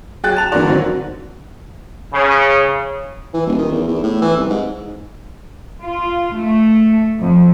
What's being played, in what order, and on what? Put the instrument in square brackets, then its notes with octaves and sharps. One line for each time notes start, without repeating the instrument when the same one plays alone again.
[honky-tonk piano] F#3 G#4 G5 F#6 A6
A5 F7
D3 E3 F#4 A#4 D5
G#2 D#3 F#3 C4 F#4
[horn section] C#3
[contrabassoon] E3
D#1
D#3
E2
E2
A2
E3
C2
G#2
[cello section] F4
A3
F2